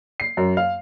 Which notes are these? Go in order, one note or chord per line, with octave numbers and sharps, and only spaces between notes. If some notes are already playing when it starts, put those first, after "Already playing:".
C7
F#2
F5